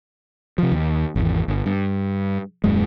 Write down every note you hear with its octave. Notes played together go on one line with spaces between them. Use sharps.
C3 F3
D#2
G#1 E2
G1
G2
D#1 F#2 G#3